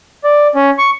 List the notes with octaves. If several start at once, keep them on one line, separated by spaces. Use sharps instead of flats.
D5
C#4
C#6